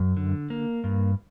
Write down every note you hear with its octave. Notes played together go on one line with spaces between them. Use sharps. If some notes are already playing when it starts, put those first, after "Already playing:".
Already playing: F#2
D3
A#3
G2